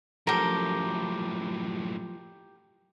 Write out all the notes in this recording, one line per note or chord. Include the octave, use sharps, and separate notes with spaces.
F#2 A2 F3 G4 A4 A#4